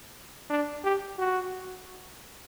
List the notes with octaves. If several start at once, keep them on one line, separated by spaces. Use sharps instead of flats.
D4
G4
F#4